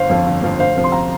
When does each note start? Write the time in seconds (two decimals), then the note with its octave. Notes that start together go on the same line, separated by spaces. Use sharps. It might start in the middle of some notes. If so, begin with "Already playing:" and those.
Already playing: G1 C5 F5
0.09 F2 F3
0.26 G1
0.42 F2 F3
0.59 D2 C5 F5
0.76 C3 F3
0.84 C6
0.92 F5 A#5